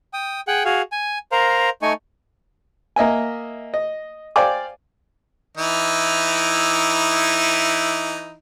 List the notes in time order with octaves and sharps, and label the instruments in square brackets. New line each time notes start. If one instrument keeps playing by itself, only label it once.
[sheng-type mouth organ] G5 D#6
G#4 F#5 G5
F#4 G#4 F5
G#5
A#4 C5 F5 A#5
A3 D#4 G#5 C#6
[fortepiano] A#3 D#5 E5 G#5
D#5
C5 D5 F5 G5 G#5 D6
[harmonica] E3 D#4 E4